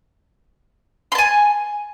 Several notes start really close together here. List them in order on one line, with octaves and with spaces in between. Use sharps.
C6 A5 G#5